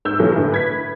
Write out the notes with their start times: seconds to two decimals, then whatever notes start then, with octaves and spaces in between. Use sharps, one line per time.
0.05 G#2 E6 G6
0.19 G2 B2 E3 F#3 A3
0.36 A2 D3
0.52 B4 G#6 B6